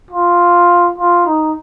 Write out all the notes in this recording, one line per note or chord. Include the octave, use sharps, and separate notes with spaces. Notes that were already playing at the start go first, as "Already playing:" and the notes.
F4
F4
D#4